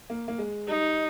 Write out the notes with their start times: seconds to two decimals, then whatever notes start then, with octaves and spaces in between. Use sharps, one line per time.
0.10 A#3
0.28 A#3
0.38 G#3
0.68 G3 D#4